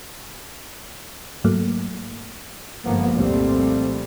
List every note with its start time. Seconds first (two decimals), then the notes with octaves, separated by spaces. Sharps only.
1.44 G#2 F#3 A3 A#3
2.85 G1 G#2 F3 A#3 B3
3.15 C2 F2 A#2 G3 A3 C4